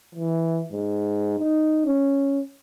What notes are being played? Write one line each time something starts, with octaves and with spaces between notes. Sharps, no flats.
E3
G#2
D#4
C#4